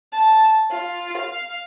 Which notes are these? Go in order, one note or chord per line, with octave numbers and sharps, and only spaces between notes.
A5
F4
F5